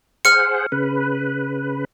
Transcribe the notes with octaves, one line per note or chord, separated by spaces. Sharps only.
G#4 C5 F#5 F6 C#7
C#3 B4